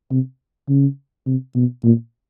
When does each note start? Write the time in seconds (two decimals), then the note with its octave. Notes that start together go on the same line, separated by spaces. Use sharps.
0.11 C3
0.69 C#3
1.26 C3
1.55 B2
1.83 A#2